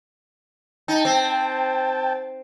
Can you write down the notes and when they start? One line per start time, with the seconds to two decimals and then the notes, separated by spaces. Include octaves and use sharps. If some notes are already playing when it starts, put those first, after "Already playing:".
0.88 D#4 G5 A5
1.05 C4